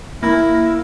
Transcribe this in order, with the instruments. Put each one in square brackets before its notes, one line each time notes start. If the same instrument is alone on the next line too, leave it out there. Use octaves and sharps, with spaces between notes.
[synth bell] A#3 [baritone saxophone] E4